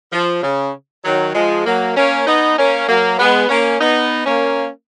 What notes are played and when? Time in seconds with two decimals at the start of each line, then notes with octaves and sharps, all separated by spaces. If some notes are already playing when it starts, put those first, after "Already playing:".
0.13 F3
0.43 C#3
1.05 D#3 F#3
1.35 F3 G#3
1.66 F#3 A#3
1.96 A#3 C#4
2.27 B3 D#4
2.57 A#3 C#4
2.88 F#3 A#3
3.19 G#3 B3
3.49 A#3 C#4
3.80 B3 D#4
4.26 A#3 C#4